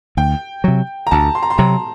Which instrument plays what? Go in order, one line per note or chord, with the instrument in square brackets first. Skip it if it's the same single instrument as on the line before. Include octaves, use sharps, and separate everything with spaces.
[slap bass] D2 [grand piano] G5
[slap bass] C3 F#3
[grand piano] A#5
[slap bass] D2 [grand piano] A5
[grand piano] C6
A#5
C6
[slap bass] C3 F#3 [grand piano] A#5